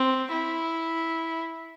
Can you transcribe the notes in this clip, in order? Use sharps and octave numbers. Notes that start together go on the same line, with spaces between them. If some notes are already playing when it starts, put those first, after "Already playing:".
Already playing: C4
E4